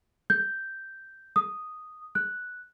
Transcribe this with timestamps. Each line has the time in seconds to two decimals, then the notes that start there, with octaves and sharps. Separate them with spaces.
0.30 G6
1.36 D#6
2.15 F#6